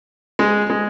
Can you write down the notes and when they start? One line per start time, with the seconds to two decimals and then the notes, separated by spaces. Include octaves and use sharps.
0.39 G#3
0.70 G#3